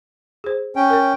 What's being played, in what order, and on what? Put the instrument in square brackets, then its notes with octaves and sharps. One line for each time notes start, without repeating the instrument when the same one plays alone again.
[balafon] G#4 C5
[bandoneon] C#4 G5
[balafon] A#4 C#5